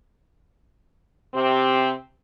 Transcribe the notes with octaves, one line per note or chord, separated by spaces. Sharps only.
C3 C4 G4